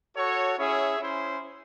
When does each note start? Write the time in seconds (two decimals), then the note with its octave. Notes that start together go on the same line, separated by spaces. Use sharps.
0.15 F#4 A4 C#5
0.57 C#4 E4 G#4 C#5 E5
0.99 C#4 E4 C5